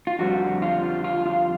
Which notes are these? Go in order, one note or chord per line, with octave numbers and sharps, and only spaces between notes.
F4
F2 D3 G3 C4 F#4
F4
F4
F4